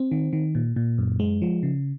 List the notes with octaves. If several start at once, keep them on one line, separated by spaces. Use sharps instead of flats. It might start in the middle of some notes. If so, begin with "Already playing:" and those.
Already playing: C4
D#3
D#3
A#2
A#2
F#2
G#3
F3
C#3